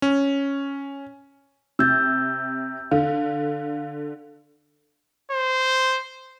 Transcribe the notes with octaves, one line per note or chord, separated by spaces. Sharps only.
C#4
C3 E6 G6 A6
D3 F5
C5